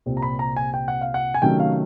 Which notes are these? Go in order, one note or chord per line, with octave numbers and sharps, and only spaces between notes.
C2 A#2 G3 C4
A#5
B5
A#5
G#5
G5
F#5
F5
F#5
G#5
C3 D#3 F#3 A3 C#4 G5
F5